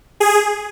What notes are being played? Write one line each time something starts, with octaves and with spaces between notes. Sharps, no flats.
G#4